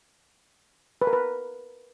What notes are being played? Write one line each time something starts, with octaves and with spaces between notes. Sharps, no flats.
B4
A#4
B4